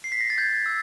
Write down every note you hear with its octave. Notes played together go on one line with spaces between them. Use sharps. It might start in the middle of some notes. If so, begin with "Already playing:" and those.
C7
B6
A#6
A6
G6 G#6
E6